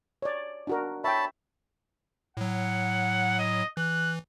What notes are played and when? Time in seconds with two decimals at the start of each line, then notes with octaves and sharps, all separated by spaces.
0.22 C#5 D5
0.67 D4 F#4 A#4
1.04 C#5 E5 G5 A5 B5
2.37 A2 F#3 F#5
3.39 D#5
3.77 E3 F#6